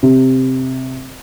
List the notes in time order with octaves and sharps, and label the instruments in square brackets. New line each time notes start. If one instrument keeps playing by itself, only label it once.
[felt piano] C3